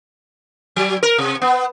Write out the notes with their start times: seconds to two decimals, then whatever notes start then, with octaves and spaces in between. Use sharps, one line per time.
0.76 F#3
1.03 A#4
1.18 C3
1.42 B3